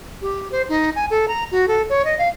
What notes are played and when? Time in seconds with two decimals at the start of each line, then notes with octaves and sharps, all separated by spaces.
0.22 G4
0.52 C5
0.69 D#4
0.96 G#5
1.11 A4
1.28 A#5
1.52 F#4
1.68 A4
1.89 C#5
2.05 D#5
2.18 F5